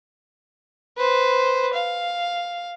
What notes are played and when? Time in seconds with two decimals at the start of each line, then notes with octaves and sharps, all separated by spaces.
0.98 B4 C5
1.74 F5